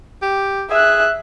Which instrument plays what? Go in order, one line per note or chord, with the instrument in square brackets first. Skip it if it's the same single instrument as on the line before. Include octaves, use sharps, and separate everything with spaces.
[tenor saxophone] G4
[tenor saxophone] G#4 [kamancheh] E5 F#6